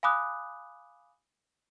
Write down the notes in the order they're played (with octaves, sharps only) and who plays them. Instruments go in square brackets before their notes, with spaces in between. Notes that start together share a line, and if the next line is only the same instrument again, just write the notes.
[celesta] F5 G#5 B5 D6 D#6 F#6